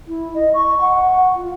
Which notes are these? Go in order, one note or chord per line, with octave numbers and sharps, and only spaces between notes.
E4
D#5
C#6
F#5
F4